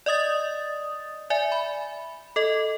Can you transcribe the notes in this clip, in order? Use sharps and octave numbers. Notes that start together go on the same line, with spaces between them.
D5 D#5 D#6 A6
D5 E5 G#5
B5
A4 D#5